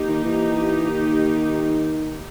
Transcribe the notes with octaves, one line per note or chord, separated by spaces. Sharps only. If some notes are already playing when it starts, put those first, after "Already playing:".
Already playing: A#3 D#4 G4
D#3
E3
D#3